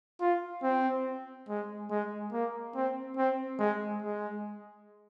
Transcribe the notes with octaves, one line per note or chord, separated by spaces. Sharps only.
F4
C4
G#3
G#3
A#3
C4
C4
G#3
G#3